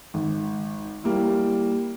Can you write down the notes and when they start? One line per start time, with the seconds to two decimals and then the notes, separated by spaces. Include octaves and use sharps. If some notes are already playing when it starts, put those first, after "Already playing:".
0.14 G#1
1.04 G3 A#3 E4